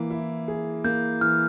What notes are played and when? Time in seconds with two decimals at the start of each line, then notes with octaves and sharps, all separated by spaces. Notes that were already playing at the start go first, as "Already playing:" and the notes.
Already playing: E3 A#3
0.11 E4
0.48 G#4
0.84 A#3 G6
1.21 E3 F6